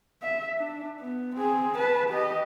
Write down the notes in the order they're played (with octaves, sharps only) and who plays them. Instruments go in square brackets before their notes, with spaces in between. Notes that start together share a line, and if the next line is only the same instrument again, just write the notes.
[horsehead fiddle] E5
D4
B3
C4 G#4
B4 A5
G4 D#5